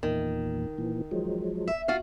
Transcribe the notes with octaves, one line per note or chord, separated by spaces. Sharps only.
E2 A#2 D#3
A#2 E3
F3 F#3 G#3
E5
F4 F#4 F5